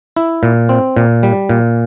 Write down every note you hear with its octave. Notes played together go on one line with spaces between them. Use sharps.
E4
A#2
C4
A#2
G3
A#2